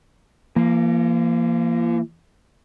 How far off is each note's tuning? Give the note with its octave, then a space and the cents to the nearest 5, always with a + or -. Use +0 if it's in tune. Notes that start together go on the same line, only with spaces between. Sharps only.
F3 -45 A#3 +0